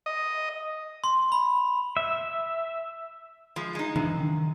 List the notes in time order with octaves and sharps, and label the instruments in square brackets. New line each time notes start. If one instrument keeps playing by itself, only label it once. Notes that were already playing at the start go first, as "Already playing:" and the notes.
[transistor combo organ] D#5
[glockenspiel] C6
B5
[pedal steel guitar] E5
[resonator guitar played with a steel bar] F3 G#3
G#3 D#4
[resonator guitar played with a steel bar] F#2 [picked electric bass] C#3 E3 D4
[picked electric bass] D#3